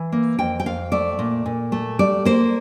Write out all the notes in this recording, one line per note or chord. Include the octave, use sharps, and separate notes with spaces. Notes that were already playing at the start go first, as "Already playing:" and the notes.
Already playing: E3
A#3
F2 G5
G5
F2 F5
A3 D5
A#2
A#2
A3
G3 D5
A#3 C5